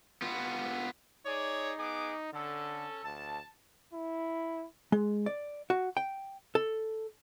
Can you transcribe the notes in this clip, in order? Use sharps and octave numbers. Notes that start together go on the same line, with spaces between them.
B3 F4
D#4 G#4 C#5 D5
B3 G#4 D6
D3 C#4 A4
D2 A5
E4
G#3
D5
F#4
G5
A4